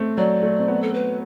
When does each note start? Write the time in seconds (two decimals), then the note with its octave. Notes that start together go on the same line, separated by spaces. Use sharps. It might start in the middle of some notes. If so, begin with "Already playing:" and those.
Already playing: A3 C4
0.17 F#3 D5
0.43 A3
0.59 C4
0.68 B3
0.82 A4
0.94 B4